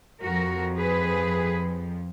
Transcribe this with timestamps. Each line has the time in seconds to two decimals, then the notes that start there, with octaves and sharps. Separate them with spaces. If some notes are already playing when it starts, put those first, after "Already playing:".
0.24 F2 F3 F#4 A#4
0.78 G#4 B4